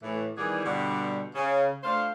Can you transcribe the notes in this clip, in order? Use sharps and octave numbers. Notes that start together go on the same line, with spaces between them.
A2 E3
D#3 E3 G3 B3 G#4 D5
G2 B2 D3 G3
C#3
A3 D4 F4 C5 F5